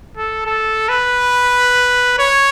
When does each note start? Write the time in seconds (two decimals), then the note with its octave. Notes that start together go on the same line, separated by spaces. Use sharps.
0.17 A4
0.46 A4
0.89 B4
2.19 C#5